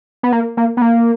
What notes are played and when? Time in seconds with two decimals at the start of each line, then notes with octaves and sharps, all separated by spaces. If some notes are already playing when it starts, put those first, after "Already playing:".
0.23 B3
0.32 A#3
0.57 A#3
0.77 B3
0.81 A#3